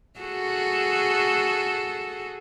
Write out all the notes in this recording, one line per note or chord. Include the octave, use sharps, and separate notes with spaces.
F#4 G#4 A4